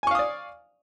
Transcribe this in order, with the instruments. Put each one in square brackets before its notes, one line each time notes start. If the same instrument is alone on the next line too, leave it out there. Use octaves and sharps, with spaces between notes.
[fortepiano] G#5
C#6
F5
D#6
D5